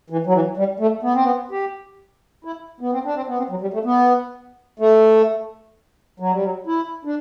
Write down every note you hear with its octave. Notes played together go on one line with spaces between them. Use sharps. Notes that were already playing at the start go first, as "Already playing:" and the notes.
E3
F#3
E3
G3
A3
B3
C4
B3
G4
E4
B3
C4
D4
C4
B3
C4
F#3
G3
A3
B3
A3
F#3
G3
F#3
E4
D4